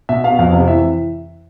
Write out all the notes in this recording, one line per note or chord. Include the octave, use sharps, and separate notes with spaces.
B2 E5
B3 F5
F2 F5
C3
E3 E5